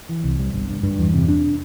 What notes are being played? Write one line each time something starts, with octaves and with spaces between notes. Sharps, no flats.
E3
C2
G3
G1
G2
G2
E2
C3
D4